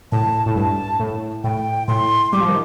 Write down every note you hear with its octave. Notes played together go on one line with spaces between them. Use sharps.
A2 A5
A2
G2 A5
A2
A2 G5
A2 C6
G3 D6
F3
D#3